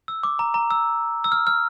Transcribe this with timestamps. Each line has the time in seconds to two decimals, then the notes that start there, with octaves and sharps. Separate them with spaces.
0.08 E6
0.23 D6
0.39 A#5
0.54 A#5
0.71 E6
1.24 E6
1.32 F6
1.47 F6